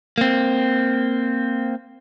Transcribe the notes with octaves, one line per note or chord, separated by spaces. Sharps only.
A#3 C4